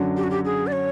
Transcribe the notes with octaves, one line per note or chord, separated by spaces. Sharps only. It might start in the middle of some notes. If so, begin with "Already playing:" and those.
Already playing: F#2 D3 F#3
G4
F#4
G4
G#4
D5
C#5